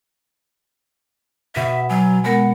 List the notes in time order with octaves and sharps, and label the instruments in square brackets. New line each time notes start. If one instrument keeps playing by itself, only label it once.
[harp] B2 D#7 E7 [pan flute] E5
[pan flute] F#3 [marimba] G#5
[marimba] G#3 B3 A#4 [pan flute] F#5